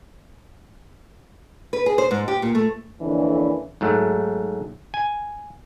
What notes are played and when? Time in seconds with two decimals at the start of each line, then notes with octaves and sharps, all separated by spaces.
1.73 B4
1.86 G#4
1.98 C5
2.11 G#2
2.28 G4
2.42 A#2
2.55 A3
3.01 F2 A#2 D3 E3 C#4 D4
3.81 G#2 F#3 A3
4.94 G#5